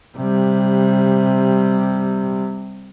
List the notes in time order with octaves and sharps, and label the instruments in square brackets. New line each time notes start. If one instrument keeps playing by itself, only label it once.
[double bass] C3 G3